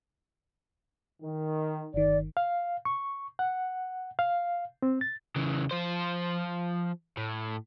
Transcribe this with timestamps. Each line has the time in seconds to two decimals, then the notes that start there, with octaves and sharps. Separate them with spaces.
1.23 D#3
1.94 G1 D#3 D5
2.37 F5
2.85 C#6
3.39 F#5
4.19 F5
4.82 C4
5.01 A6
5.36 C#3 E3
5.71 F3 C5
7.17 A2